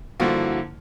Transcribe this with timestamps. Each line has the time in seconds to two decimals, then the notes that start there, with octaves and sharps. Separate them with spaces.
0.20 G2 D3 F3 A#3 E4 F#4